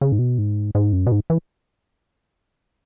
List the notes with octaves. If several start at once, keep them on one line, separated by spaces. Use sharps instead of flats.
C#3
G#2
B2
G#2
G#2
F#2
B2
G#2
E3